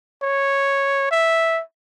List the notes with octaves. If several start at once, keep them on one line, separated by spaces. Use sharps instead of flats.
C#5
E5